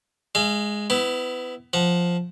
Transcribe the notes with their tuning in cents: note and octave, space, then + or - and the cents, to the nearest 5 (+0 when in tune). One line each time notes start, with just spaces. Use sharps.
G#3 +0 F5 -45
B3 +30 E4 +0
F3 +5 F#5 +0